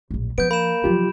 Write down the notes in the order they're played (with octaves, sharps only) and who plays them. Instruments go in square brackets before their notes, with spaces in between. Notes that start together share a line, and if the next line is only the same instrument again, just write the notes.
[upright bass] D1 A#1
[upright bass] F3 [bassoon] B3 [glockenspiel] G6 D7
[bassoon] A#3 [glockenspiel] B5 E7
[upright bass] C#3 F3 [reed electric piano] F#3 F4 G4